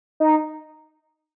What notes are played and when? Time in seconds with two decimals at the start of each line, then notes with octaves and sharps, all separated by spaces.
0.20 D#4